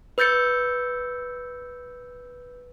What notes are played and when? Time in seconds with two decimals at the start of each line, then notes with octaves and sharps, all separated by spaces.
0.18 B4 E6 G6 A6 C#7